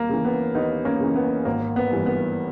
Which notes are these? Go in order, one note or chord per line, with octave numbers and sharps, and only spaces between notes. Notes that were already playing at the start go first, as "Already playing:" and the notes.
Already playing: D#2 A#3
C#3 E3
B3
D#2 B3 D#4
A#3 C#4
C#3 E3
B3
G#1 A#3
B3
G2 E3
B3